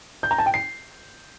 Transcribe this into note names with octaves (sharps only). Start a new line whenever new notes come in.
G6
A#5
A5
G5
C7